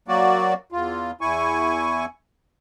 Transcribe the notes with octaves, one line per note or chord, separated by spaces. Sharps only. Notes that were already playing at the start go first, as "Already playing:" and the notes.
F#3 A#3 F#4 D5
E2 F4
E2 E4 G#5 C#6